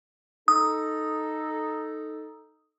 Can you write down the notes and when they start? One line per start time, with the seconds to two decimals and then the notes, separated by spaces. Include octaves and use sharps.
0.48 D#4 A4 D#6